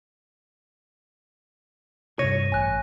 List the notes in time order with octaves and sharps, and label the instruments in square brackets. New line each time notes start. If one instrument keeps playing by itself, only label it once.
[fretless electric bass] G2 C3 [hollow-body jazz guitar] C#5 [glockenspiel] A#6 D#7
[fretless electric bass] A1 [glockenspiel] G#5 F#6